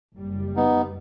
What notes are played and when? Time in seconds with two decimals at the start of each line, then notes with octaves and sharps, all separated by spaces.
0.15 F#1 G3
0.56 B3 D#4